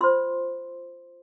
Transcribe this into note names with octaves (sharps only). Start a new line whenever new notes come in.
F4 C5 C6